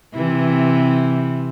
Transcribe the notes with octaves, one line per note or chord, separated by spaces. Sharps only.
C3 E3